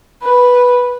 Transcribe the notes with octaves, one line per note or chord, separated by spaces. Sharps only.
B4